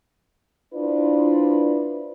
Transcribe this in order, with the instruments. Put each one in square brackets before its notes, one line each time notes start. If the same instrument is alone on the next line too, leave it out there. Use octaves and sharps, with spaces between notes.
[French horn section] D4 E4 F4 B4 C5 D5